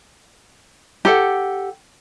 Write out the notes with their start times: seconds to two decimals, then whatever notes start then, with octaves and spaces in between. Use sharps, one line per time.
1.05 G4 A4 F#5